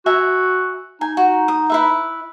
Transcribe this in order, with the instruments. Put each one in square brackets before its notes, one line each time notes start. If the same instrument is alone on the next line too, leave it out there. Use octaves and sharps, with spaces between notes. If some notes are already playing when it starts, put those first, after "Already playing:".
[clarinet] F#4 [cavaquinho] E5 G#5 A#5
[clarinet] D#4 [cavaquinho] G#5
[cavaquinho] F#4
D#6
E4 B4 E5